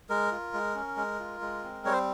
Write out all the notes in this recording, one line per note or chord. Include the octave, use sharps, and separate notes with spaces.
G#3 A#4
F4
G#3
C#4
G#3
F4
G#3
C4
G3 C#5
C5